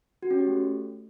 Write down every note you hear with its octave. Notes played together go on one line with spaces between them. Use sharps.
F#4
C#4
G4
A3